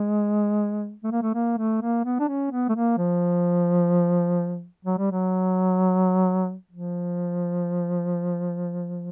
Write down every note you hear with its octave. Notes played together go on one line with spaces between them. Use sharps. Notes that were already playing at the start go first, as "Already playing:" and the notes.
Already playing: G#3
A3
A#3
A3
A#3
A3
A#3
B3
D4
C#4
B3
A3
A#3
F3
F#3
G3
F#3
F3